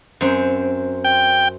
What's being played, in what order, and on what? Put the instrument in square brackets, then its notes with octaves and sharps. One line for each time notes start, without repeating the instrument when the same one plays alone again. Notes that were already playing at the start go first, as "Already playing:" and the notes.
[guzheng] F#2 C4
[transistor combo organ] G5